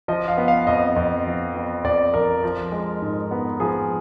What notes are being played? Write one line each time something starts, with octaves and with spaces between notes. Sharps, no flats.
F3 D#5
F5
B3
F5
F2 D#5
F2
F3
B3
F2 D5
F2 A#4
F3
G#3
G#2
B3
F3 G#4